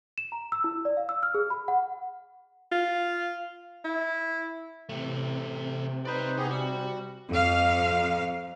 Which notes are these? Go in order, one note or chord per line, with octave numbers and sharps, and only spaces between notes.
E7
A#5
E6
E4
D5
F5
E6
F6
G#4
B5
F#5
F4
E4
C3 E3 A3
D#4 B4 C5 D5 B5
B3 D#4 G4 G#4
G3 F#4
F2 F5